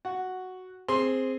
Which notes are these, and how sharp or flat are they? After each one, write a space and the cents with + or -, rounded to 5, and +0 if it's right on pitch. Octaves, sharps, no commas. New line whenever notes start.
F#4 +0 F#5 +0
C4 +0 G#4 +0 C6 +5